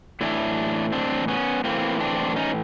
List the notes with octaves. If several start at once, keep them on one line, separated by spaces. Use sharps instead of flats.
A2 E3 D4 E4
C4 D4
B3 C#4
A2 E3 A#3 C4
C4 D4
C#4 D#4